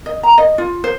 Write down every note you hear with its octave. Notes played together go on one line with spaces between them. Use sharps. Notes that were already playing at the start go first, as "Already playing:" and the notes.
D#5
A#5
D#5
F4
C5